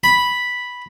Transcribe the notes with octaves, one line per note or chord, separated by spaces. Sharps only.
B5